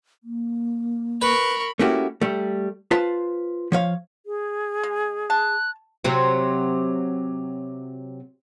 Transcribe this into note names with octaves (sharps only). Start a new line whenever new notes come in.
A#3
A#4 B4 B5 C#6
A3 A#3 C#4 E4 F#4 G4
G3 A3
F4 B4 C5 A5
F3 C#5 F5
G#4
G#3
A5 F#6
C3 F#3 C4